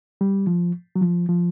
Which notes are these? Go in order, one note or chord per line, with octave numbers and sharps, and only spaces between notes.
G3
F3
F#3
F3
F3